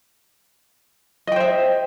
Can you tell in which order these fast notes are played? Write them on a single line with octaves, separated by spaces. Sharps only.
D#5 G5 C5 E5